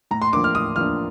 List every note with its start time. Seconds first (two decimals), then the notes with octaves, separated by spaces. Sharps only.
0.11 A2 A#5
0.22 C6
0.33 F3 A#3 D4 D6
0.44 F6
0.54 A2 D#6
0.76 F3 A#3 D4 F6